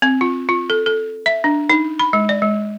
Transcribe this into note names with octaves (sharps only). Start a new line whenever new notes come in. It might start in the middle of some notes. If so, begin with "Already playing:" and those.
C4
F4
F4
A4
A4
E5
D4
D#4
B5
G#3
D5
G#3